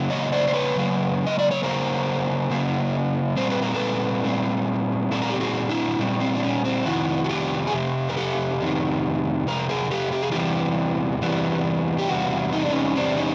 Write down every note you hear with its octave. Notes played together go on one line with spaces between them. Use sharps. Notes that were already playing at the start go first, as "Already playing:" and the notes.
Already playing: C#3 F#3 A#3
C#5 D#5
C5 D5
C5
B4 C#5
C#3 F#3 A#3
D#5
D5
C#5
C#3 F#3 A#3 A#4 C5
C#3 F#3 A#3
A#2 G3 C4 C5
B4
A#4
A4 B4
A#2 G3 C4
A#2 G3 C4 A4
A#4
G4 A4
F#4 G#4
D4 E4
A#2 G3 C4
C4
D4
C#4
C4
F2 C3 D#3 E4 F#4
F#4
F4 G4
G#4
F2 C3 G4
A#4
G4 A4
F2 C3 D#3
F2 C3 A#4
G#4 A#4
G4 A4
G4
G#4
E2 C3 E3 G3 F4 G4
E2 C3 E3 G3
G4
E2 C3 G3 F#4
D#4
D4
C#4 D#4
E2 C3 E3 G3 C4 D4
C#4 D#4